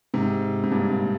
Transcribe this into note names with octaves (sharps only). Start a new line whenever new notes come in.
G#2 C3
G#2
G2 A#2
G#2